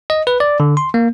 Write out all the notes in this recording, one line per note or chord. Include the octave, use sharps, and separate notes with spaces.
D#5
B4
D5
D3
C6
A#3